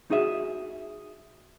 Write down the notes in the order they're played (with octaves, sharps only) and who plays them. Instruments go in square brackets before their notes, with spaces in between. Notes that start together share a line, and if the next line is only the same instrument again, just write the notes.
[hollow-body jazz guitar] D#4 F#4 G#4 E5